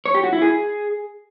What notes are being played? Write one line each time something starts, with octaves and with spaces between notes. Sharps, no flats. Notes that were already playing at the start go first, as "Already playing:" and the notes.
C#5
G4
F#4
E4
G#4